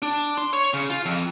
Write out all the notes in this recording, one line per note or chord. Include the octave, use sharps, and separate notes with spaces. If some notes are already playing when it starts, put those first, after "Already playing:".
D4
C6
C#5
C#3
F4
F2